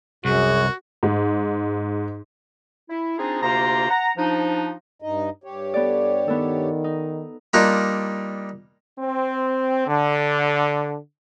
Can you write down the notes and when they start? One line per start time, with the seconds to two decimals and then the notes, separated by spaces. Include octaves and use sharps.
0.25 C2 F#2 F#4 G#4
1.03 G#2
2.89 E4
3.18 C4 D4 D#4 F4 G#4
3.42 D2 C3 A#3 F4 C5 A#5
3.90 F#5 A#5
4.17 F3 D4 D#4
5.02 G2 D#4 D#5
5.44 G2 G4 C#5
5.74 B3 A4 D5
6.28 D#3 B3 A4
6.84 D#4
7.54 G3 A#3 D4 D#4 F4 A#4
8.99 C4
9.87 D3